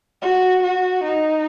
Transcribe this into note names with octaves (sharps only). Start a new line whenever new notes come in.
F#4
F#4
D#4